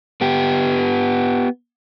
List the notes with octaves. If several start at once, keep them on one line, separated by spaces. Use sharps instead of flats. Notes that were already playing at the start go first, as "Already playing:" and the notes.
B3 G4